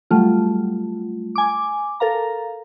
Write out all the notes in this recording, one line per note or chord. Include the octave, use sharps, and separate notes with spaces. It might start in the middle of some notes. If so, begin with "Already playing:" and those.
F#3 G3 A3 F4
G#5 D6
A4 A#4 F5 A#5